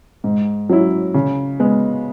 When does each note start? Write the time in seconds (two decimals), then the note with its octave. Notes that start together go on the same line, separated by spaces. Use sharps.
0.24 G#2
0.70 F#3 C#4 E4
1.14 C#3
1.60 G#3 B3